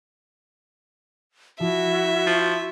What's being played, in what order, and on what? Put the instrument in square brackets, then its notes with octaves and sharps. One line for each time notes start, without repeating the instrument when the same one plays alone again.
[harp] F3 [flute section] E4 F#4 [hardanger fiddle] E5
[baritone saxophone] F3 [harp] C6 C#6